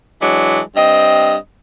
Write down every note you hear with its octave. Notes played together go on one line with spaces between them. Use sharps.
E3 F#3 G#3 D4
G2 C4 D#5